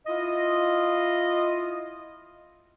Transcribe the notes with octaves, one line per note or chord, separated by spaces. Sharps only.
E4 F4 D#5